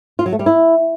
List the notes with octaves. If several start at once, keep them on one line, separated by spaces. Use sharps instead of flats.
F4
F#3
A3
G3
E4